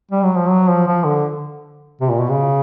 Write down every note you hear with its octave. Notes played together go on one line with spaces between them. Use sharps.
G3
F#3
F3
F#3
F3
F3
D3
C3
A#2
B2
C#3